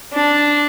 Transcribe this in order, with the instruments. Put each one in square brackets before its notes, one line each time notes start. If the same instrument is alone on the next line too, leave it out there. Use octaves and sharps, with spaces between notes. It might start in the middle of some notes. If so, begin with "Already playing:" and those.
[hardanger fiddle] D4